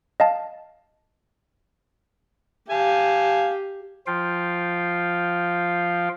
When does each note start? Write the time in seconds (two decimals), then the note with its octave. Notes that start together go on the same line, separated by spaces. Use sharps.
0.20 D#5 F5 A5
2.70 G4 F5 G#5 A5
4.07 F3 F4 F5 G5